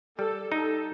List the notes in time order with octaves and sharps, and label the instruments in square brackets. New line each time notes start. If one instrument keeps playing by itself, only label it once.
[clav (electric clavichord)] G3 [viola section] A4
[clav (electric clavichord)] D#4 [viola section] A4